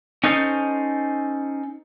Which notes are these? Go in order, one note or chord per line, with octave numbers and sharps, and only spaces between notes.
C#4 D#4 A4 C5